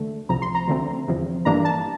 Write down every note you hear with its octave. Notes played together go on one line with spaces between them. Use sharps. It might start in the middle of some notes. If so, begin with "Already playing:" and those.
Already playing: D2 D3 A3
C2 C3 F3 A#5
C6
A#5
D2 D3 A3 C4
E2 C3 F3
G1 G2 E3 A#3 D4 A#5
A5